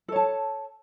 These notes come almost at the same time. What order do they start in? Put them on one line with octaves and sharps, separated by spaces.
A4 C#5 A5